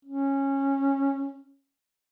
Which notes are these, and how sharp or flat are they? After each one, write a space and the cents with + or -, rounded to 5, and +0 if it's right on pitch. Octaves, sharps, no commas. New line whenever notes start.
C#4 -15